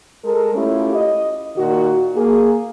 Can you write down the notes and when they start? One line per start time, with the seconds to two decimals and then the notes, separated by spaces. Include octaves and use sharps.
0.25 G#3 A4 A#4
0.55 A3 C#4 E4 F4 G4
0.94 D#5
1.57 A#2 D#3 F#4
2.15 A#3 G#4